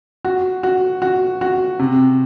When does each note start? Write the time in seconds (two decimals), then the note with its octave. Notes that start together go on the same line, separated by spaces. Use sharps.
0.25 F#4
0.63 F#4
1.02 F#4
1.41 F#4
1.79 C3